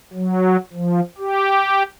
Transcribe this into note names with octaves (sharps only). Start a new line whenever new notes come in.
F#3
F3
G4